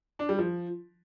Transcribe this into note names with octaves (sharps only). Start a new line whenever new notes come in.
D4
G3
F3